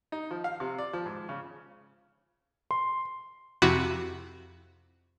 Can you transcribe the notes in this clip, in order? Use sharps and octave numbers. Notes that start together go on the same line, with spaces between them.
D#4
F3
F5
C3
D5
F3
G#2
C#3
C6
F2 C3 E4 F#4 B5 D6